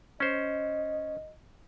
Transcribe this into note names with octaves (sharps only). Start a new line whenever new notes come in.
C#4 C5 D#5